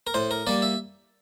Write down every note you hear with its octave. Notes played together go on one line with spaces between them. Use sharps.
A#4
A2 C5
A#4
G3 A#3 D5
E5